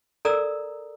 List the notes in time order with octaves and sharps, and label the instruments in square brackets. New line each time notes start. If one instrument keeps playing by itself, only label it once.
[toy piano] A4 A#4 D5 A#5 D#6 E6